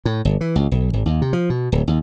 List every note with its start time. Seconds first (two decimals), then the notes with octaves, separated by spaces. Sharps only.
0.05 A2
0.25 G1
0.41 E3
0.56 C#2
0.72 B1
0.93 G#1
1.06 D#2
1.22 C3
1.33 F3
1.50 B2
1.72 D1
1.87 D#2